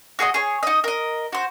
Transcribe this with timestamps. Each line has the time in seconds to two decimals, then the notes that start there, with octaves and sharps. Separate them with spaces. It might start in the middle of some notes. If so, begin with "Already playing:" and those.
0.19 F#4 G#4 C#5 D#5
0.34 G#4 C#5
0.63 D#4 D#5
0.84 A#4 D#5
1.33 F#4 C5